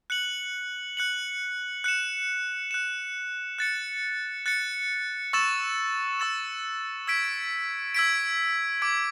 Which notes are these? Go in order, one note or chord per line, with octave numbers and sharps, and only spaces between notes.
F#6 C#7 F#7
F#6 C#7 F#7
F#6 C#7 E7
F#6 C#7 E7
F#6 A6 C#7
F#6 A6 C#7
C#6 E6 A6 E7
C#6 E6 A6 E7
E6 G#6 B6 D7
E6 G#6 B6 D7
D6 G#6 D7